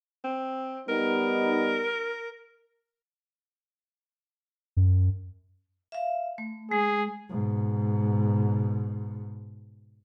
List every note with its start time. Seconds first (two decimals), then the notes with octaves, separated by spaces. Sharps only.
0.24 C4
0.89 G3 B3 D#4 A#4
4.77 F#2
5.92 E5 F5
6.38 A3
6.71 G#3 G#4
7.29 G#2 B2